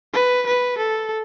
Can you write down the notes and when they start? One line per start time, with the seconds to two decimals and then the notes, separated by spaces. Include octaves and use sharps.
0.14 B4
0.46 B4
0.78 A4